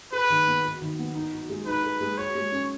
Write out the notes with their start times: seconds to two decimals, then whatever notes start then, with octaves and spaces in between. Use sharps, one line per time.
0.12 G#4 B4
0.30 D#3
0.47 B3
0.64 F#4
0.82 D#3
0.99 B3
1.15 D#4
1.33 F#4
1.50 G#3
1.66 D#4 B4
1.84 G#4
2.01 G#3
2.18 F#4 C#5
2.35 G#3
2.52 C#4